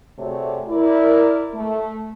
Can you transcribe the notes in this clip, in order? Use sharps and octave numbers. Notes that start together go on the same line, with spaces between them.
C3 A3 F#4 G#4 C#5 D5
E4 A#4 D5
A3